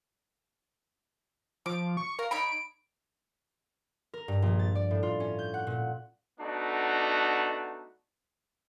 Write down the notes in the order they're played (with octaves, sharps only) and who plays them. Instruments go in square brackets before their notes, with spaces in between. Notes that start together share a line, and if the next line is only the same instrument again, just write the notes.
[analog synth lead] F3 [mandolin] D6
[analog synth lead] C#6
[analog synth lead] A#4 [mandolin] F5
[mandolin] D#4 C#5 B5 [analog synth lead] D7
[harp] A#4
G2
A#1
A6
D5
A2
F4
C#4
G6
F#5
A#2
[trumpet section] A3 B3 D4 D#4 F#4